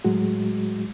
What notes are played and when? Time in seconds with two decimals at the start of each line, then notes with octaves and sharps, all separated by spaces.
0.04 A2 F#3 G#3 F#4